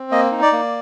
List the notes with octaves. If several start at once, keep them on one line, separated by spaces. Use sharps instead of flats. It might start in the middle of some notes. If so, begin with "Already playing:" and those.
Already playing: C4
A#3 D#5
D#4
D5
A#3